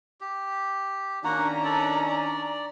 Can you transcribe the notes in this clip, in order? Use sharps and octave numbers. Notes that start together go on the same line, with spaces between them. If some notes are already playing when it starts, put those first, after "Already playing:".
G4
D#3 A#3 C#4 D4 F#4 F#5 A#5
A4 D5
D5